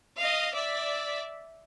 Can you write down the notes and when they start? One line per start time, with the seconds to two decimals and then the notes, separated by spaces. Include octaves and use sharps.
0.18 D#5 F5
0.54 D5 E5